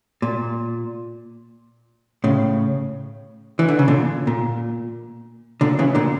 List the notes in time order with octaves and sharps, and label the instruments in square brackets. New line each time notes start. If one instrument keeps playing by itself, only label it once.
[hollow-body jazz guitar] A#2
A2 C#3
E3
D3
C#3
A#2 D3
A#2
A#2 D3
C#3 E3
A#2 D3